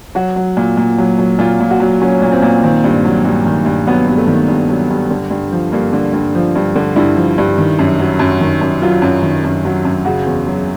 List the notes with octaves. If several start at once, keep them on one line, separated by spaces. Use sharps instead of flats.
F#3 F#4
F#3
A#2
A#2
F#3
F#3
A#2 F4
A#2
F#4
F#3
F#3 C#4
A#2
C4
A#2
D#3 C4
G2
F#3
G2
D#3
G2
F#3 B3
G2
A3
D#3
G2
F#3
G2
D3
G2
F3
G2 A#3
D3
G2
F3
G2
D3
G2 E4
F3
G2
D#3
F#2
F#3
F#2
D#3
F#2
F#3 F4
F#2
D#3
F#2
F#3
F#2
C#3 F#4
E2
F#3